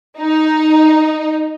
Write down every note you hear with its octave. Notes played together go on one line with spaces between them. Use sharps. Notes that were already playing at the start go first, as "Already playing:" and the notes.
D#4